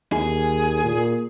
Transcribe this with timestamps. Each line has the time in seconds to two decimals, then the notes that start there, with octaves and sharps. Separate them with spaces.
0.12 D#2 G#4
0.84 A#2